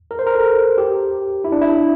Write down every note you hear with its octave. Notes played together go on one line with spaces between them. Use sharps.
A#4
C5
A#4
A4
G4
E4
D4
E4